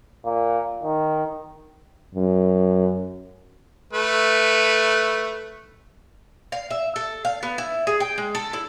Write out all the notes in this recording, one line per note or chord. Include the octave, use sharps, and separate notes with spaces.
A#2
D#3
F#2
A3 B4
F5
E5
A4
F5
B3
E4
G#4
G5
G#3
A4
E4